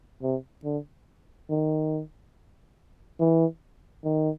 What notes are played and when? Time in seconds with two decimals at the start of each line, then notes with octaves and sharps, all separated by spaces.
0.23 C3
0.65 D3
1.50 D#3
3.20 E3
4.04 D#3